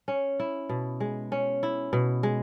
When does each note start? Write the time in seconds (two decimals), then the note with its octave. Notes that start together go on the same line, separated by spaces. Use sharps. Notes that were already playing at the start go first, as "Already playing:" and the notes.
0.08 C#4
0.40 E4
0.69 B2
1.00 G#3
1.32 C#4
1.63 E4
1.93 B2
2.23 G#3